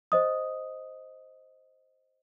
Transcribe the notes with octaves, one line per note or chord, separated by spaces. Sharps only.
C5 D#5 D#6